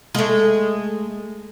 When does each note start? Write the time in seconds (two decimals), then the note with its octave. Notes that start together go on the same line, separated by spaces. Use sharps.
0.15 G#3 A3